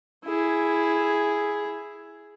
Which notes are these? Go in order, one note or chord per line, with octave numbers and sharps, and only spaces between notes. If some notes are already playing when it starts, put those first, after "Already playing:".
E4 G#4